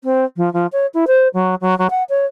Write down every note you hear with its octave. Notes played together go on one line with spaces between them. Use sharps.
C4
F3
F3
C#5
E4
C5
F#3
F#3
F#3
F#5
C#5